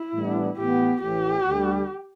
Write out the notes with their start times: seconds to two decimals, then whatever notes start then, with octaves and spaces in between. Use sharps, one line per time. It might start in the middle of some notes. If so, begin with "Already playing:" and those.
Already playing: E4
0.14 A2 E3 G3 B3 D4
0.57 A2 E3 B3 G4
1.02 A1 A2 E3 G4
1.46 D2 D3 G3